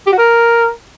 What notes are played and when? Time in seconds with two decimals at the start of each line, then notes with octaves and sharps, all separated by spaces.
0.07 G4
0.12 F#4
0.18 A#4